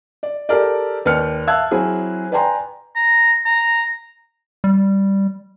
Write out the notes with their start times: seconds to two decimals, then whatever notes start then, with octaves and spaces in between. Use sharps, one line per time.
0.23 D5
0.49 G4 A4 A#4 D5
1.05 D#2 B4 D5 G5 F6 C#7
1.47 E5 F5 A5 E6 F#6 G#6
1.71 F#3 C4 E4 G#4
2.32 B4 D5 G5 G#5 A#5 C6
2.96 A#5
3.45 A#5
4.64 G3